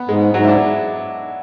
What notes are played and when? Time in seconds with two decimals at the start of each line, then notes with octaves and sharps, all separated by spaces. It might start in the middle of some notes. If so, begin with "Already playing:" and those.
Already playing: B3
0.09 G#2 G#3
0.34 G#2 F#3
0.43 E4
0.48 D4